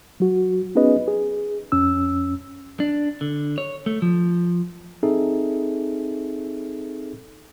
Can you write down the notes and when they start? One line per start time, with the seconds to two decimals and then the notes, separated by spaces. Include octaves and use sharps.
0.20 F#3 F#4
0.75 B3 C#4 D#4 G#4 B4 D#5
1.08 G#4
1.72 F2 C#4 E6
2.80 D4
3.21 D3
3.58 C#5
3.86 A3
4.02 F3
5.03 C4 D#4 G#4 A4 E5